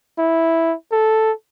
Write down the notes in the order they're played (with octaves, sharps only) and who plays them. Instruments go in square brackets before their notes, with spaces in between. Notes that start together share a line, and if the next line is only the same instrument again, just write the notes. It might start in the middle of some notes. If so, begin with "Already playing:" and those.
[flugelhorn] E4
A4